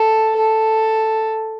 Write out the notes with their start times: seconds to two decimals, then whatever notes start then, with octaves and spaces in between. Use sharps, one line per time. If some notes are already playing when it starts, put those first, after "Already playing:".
Already playing: A4
0.36 A4